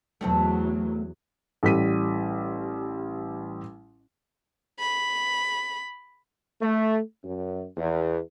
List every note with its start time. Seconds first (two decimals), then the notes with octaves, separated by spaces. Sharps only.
0.21 E2 F#3 A3 C4 A4
1.63 A1 G3 B6 D#7
4.79 B5
6.61 A3
7.24 F#2
7.77 E2